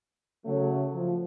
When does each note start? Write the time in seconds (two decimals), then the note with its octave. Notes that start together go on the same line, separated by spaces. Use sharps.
0.45 C#3 F#3 A3
0.94 F3